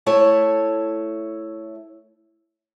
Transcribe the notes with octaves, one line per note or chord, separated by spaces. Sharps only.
A3 E4 C#5